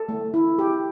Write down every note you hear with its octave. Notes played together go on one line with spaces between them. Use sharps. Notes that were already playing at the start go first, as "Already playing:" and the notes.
Already playing: A4
A3
E4
G4